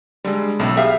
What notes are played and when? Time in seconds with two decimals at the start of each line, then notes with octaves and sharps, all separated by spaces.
0.24 D3 G3 G#3
0.59 B1 A2 C#3 A3
0.77 G4 G#4 E5 F5